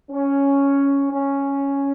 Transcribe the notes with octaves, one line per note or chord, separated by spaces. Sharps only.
C#4
C#4